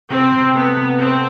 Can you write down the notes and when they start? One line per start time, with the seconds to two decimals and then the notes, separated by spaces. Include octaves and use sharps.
0.10 C3 C4
0.32 C3
0.54 A3 B3
0.76 C3
0.98 A3 C4